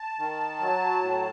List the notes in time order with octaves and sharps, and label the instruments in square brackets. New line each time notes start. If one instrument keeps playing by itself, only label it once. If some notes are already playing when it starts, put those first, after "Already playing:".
Already playing: [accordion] A5
D#3
F#3
A2